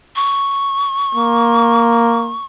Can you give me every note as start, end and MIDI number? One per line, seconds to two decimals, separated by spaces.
0.16 2.45 85
1.15 2.37 58